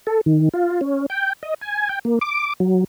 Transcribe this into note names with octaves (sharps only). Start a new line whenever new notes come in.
A4
D#3
F4
C#4
G5
D#5
G#5
G5
A#3
D6
F#3